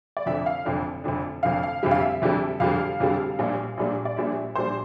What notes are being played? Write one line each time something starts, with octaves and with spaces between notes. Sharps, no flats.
D5
F1 F2 D3 E5
F5
F1 F2 D3
F1 F2 D3
F1 F2 D3 F5
F5
F1 F2 D3 G3 E5
F5
E5
F1 F2 D3 G3
F1 F2 D3 G3 F5
F1 F2 D3 G3
A#1 A#2 G3 D4
A#1 A#2 G3 D4
D5
A#1 A#2 G3 D4 E5
A#1 A#2 G3 D4 C5